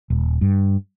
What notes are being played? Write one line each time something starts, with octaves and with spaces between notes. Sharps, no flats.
D#1
G2